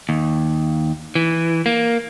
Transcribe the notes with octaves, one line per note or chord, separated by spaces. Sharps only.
D#2
E3
A#3